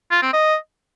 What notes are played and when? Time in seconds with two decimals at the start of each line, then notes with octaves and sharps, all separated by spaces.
0.11 F4
0.22 C4
0.33 D#5